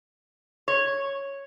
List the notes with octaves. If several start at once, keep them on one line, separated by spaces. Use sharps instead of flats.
C#5